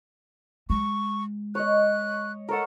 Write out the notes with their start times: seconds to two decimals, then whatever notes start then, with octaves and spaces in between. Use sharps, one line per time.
0.70 G#3 C#6
1.55 C#5 D#5 F#6
2.49 A4 A#4 C#5 F#5